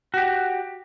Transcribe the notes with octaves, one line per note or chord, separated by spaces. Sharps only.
F#4 G4